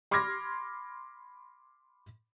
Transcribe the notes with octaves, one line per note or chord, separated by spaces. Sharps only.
B5 C6 D6 F6 G#6 A#6